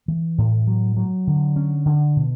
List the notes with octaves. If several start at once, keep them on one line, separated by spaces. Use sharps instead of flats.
E3
A2
F#3
F#3
D3
C#4
D3
B2